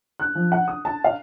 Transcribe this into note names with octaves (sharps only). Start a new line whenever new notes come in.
F#6
F3
F#5
D#6
A5
F5